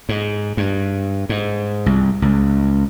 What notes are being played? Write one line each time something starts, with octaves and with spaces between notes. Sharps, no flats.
G#2
G2
G#2
C2
C#2